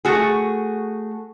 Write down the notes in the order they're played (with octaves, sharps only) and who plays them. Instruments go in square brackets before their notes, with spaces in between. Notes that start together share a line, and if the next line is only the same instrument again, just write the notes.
[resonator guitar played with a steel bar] A3 F#4 G#4